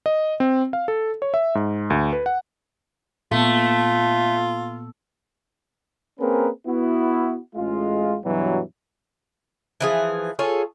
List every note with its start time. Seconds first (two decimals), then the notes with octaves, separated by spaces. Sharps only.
0.06 D#5
0.40 C4
0.73 F5
0.88 A4
1.22 C#5
1.34 E5
1.55 G#2
1.90 D2
2.13 B4
2.26 F#5
3.31 A#2 A3 B3 F4
6.19 A#3 C4 C#4 G#4 A#4 B4
6.66 B3 E4 F#4
7.55 A1 G#3 F4
8.24 G2 B2 E3 F#3
9.80 E3 F3 G#4
10.39 F4 G#4 A4 C#5